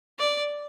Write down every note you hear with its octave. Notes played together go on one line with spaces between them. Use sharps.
D5